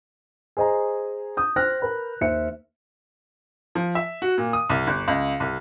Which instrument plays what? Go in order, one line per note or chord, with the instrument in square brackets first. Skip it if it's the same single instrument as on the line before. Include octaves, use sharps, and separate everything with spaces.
[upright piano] G#4 C5 D#5 G#5 A#5
D#6 G6
C5 G5 F6 F#6 A#6
A#4 B4 B5
D#2 C5 E5 C#7
F3
E5
F#4
A#2
D#6
C2
G1
C#2
C2